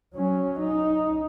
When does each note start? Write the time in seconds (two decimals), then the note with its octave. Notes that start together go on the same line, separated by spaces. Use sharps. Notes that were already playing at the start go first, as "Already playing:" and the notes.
0.15 F#3 C#4
0.60 D#4